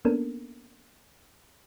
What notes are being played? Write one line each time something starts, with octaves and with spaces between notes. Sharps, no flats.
A#3 B3 C#4 D4 A4 A#4